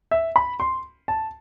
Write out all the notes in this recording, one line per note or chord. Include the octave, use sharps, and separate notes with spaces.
E5
B5
C6
A5